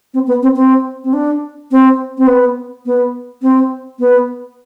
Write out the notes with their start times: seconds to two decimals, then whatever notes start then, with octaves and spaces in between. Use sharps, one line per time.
0.14 C4
0.27 B3
0.43 C4
0.56 C4
1.04 C4
1.13 D4
1.71 C4
2.18 C4
2.27 B3
2.86 B3
3.42 C4
3.99 B3